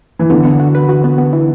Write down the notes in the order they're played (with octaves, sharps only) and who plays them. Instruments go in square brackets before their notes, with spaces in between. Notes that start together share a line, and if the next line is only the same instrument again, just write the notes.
[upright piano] E3
[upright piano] D3 [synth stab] B3
[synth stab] B3
F#4
B4
F#4
B3
B3
E3